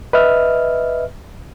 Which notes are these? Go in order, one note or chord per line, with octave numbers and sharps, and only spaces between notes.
B4 D#5 E5 F6